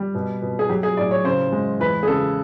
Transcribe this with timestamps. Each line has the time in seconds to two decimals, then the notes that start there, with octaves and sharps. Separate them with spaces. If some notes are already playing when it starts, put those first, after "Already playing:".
Already playing: G3
0.15 B2
0.42 B2
0.59 G#4
0.69 F#3 G4
0.83 G#4
0.97 A2 D5
1.11 C#5
1.24 C#3 C5
1.52 G#3
1.80 E2 B4
2.03 G#4
2.07 C#3 A4